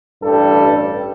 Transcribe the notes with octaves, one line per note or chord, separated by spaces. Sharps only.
A1 G2 G3 A4